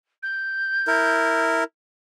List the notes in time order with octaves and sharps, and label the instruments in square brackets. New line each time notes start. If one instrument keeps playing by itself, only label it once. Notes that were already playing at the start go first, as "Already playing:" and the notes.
[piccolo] G6
[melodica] E4 A#4